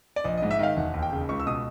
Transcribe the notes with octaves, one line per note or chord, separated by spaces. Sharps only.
D5
A#1 D#5
D#5
G#2
E5
D#3 F5
E1 F#5
D#2
G5
C#3
C#2 C#6
E6
B2 D#6